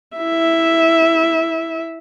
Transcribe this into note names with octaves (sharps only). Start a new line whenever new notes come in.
E4 E5